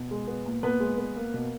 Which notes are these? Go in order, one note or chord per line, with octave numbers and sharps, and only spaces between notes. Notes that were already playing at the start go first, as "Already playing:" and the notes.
Already playing: B2
G#3
B3
A#2
A#2 B3 B4
G#3
B3
A#3
B2